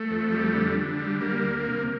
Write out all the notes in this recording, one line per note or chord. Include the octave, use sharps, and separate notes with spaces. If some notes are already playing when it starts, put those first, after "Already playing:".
Already playing: A3
F2
G3
D3
D3
G3
G3 A#3
D2
C3